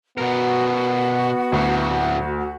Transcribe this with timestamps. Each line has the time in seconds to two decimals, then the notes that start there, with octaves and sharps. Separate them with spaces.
0.18 B2 B3 F#4 A#4
1.52 D2 A2 F#3